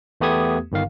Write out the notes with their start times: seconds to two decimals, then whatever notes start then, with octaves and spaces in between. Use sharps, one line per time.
0.21 E2 A3 B3 G4 D#6 G#6
0.72 G1 D#3 F5